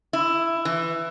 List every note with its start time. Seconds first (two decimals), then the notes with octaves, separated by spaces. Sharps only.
0.13 E4
0.65 E3